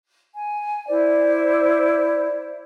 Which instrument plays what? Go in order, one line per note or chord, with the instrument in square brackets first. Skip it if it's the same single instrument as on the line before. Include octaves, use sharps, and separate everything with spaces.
[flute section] G#5
E4 C5 D5